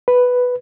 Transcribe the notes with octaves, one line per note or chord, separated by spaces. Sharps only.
B4